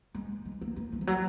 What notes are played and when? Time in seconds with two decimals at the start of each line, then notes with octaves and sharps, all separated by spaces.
0.15 G#3
0.46 G#3
0.61 A#3
0.76 G#3
0.92 G#3
1.01 F3
1.07 F#3